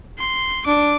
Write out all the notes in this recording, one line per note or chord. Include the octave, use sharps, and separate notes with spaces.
C6
D4 D6